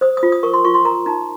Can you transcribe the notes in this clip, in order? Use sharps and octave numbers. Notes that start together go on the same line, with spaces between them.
C5 D#6
D#6
F4
D#6
A#4 C#6
C6
F4 C#6
C6
A#4 A#5
D#4 A#5